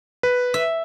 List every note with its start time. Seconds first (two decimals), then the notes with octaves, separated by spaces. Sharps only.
0.23 B4
0.54 E5